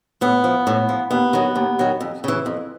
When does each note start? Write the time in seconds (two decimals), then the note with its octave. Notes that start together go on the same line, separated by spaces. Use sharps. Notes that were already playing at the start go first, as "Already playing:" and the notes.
0.21 A2 B3
0.44 F3
0.67 A2
0.89 F3
1.11 D#2 B3
1.33 D#3 F#3
1.56 D#2
1.79 D#3 F#3
2.01 F2
2.24 C#3 E3
2.46 F2